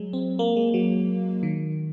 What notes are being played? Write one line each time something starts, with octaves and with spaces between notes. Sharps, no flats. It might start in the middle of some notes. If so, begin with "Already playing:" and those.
Already playing: F#3 G#3
C4
A#3
G#3
F#3
D#3